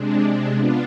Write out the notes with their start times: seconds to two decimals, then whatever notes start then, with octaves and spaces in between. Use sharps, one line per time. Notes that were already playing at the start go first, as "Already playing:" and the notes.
Already playing: C3 G#3 D4
0.55 B3 D4 F4